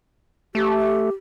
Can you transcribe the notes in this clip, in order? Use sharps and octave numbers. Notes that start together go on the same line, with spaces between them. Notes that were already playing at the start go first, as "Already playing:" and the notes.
A3 G4